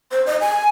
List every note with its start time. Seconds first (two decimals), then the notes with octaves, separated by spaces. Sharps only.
0.12 C5
0.26 D#5
0.41 G#5